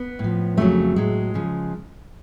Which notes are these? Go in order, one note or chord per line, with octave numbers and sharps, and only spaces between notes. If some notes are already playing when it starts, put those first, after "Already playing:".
Already playing: B3
A2
F3
F2 C#3 F#3 A3
A2 F#3 G#3
C#3 F3